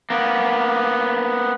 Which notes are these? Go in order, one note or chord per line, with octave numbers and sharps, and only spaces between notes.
A#3 B3